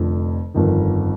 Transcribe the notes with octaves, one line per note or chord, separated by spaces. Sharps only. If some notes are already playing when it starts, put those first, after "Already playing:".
Already playing: F1 F2 D3
G1 F2 D#3